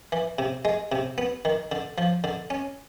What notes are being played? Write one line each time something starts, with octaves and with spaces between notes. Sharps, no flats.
E3
C3
G#3
C3
B3
D#3
D3
F3
D3
C#4